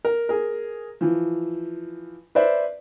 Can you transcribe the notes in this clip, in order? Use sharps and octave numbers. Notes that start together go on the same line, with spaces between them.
A#4
G#4 A#4
E3 F3
B4 C5 D5 E5